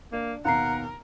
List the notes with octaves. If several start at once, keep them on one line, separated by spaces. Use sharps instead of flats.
A#3 D4
D#2 B2 A#4 F5 F#5 A#5 C7